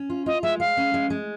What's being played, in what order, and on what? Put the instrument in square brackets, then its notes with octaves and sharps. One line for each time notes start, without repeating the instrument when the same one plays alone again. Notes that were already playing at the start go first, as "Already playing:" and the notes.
Already playing: [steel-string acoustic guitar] C#4
F4
[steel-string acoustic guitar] F4 [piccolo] D#5
[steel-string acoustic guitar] G#3 [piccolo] E5
[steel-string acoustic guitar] G#3 [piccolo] F5
[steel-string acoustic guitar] C#4
G#3
G#3